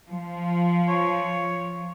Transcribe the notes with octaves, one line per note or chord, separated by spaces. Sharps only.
F3
C#5